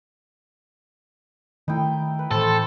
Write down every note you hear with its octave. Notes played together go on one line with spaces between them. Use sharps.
D#3 A3 D#4 E4 G5
B4
A2 E3 A3 C4 A4